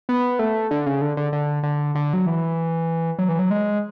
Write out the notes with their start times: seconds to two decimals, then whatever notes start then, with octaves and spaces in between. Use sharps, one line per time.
0.09 B3
0.39 A3
0.71 D3
0.86 C#3
1.01 D3
1.17 D3
1.33 D3
1.63 D3
1.95 D3
2.13 F#3
2.26 E3
3.19 F#3
3.29 E3
3.39 F#3
3.50 G#3